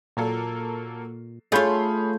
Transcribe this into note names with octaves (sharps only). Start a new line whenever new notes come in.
A#2 F#3 A#3 A4
A3 F4 G#4 C#5 F5 B5 C6 G6